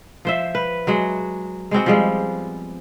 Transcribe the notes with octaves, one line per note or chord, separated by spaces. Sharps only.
F3 C5 E5
B4
F#3 G#3 F#4
G#3 B3 C4 F#4
F3 G3 G#3